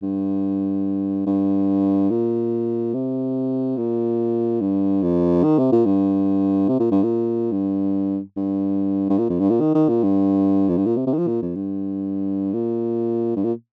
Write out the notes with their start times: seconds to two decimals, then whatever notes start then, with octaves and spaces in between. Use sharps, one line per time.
0.03 G2
1.27 G2
2.10 A#2
2.94 C3
3.77 A#2
4.61 G2
5.03 F2
5.44 D#3
5.59 C3
5.72 A#2
5.85 G2
6.69 C3
6.80 A#2
6.91 G2
7.03 A#2
7.52 G2
8.36 G2
9.10 G2
9.19 A#2
9.30 F2
9.40 G2
9.50 A#2
9.61 D#3
9.75 D#3
9.89 A#2
10.03 G2
10.69 F2
10.77 G2
10.86 A#2
10.97 C3
11.07 C3
11.14 D#3
11.18 F3
11.28 A#2
11.42 F2
11.55 G2
12.53 A#2
13.36 G2
13.44 A#2